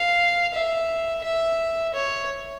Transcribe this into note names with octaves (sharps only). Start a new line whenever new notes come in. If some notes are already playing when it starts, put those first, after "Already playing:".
Already playing: F5
E5
E5
C#5